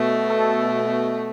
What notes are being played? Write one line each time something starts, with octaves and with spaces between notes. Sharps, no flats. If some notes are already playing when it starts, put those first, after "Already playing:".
Already playing: B2 A3
A4